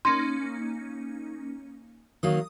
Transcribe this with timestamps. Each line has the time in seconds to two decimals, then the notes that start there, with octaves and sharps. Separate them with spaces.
0.05 A#3 C#4 D#4 C6
2.23 D#3 F#3 A#3 D#6